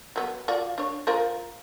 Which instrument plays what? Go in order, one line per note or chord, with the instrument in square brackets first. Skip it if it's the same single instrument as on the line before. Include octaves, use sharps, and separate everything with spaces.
[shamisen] F#3 B3
F4 F#4 D5
D4 C#5
F4 A#4 C5